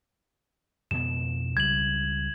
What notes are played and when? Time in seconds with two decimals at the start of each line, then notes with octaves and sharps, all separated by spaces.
0.91 F2 B2 B3 E7
1.57 C#2 G3 G#6 F#7